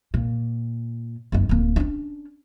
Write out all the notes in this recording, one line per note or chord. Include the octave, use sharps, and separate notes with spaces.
A#2
F#1 D#4
D1 A#3
C#4 D4